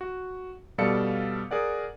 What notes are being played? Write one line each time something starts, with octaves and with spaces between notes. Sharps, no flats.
F#4
B2 G3 A4 D5 F5 C#7
G#4 A#4 D5 F#5